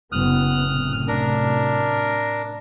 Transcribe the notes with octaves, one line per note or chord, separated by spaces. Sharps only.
F#1 B3 D#6 F6 F#6
F#2 A2 C3
D4 A#4